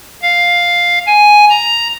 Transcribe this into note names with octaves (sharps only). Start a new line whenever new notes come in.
F5
G#5
A#5